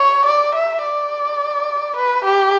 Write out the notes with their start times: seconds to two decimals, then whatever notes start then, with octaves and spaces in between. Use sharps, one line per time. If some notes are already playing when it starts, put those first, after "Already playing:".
Already playing: C#5
0.26 D5
0.55 E5
0.82 D5
1.97 B4
2.25 G4